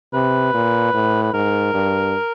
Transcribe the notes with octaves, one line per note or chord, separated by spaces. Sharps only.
C3 B4
A#2
A2
B4
G#2 A#4
G2